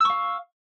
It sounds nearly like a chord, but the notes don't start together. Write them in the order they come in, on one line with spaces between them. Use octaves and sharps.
E6 C#6 F5